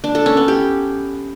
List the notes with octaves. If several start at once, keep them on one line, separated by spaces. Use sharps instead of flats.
D4
A4
C#4
B3
G4